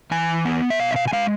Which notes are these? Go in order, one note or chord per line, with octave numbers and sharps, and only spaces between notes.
E3 G#5
B3
E5
B2 F5
E5
F5
G#5
G#3 F5